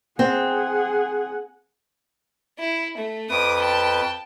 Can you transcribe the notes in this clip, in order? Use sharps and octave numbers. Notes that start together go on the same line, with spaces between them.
C4 G#4 F#5
E4
A3
F2 B4 D6 D#6
G5 A5